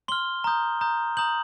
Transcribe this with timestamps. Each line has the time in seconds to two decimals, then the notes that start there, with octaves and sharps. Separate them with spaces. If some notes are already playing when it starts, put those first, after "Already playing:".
0.08 C6 F6 G7
0.44 A#5 D#6 G6
0.81 A#5 D#6 G6
1.17 A#5 D#6 G6 F#7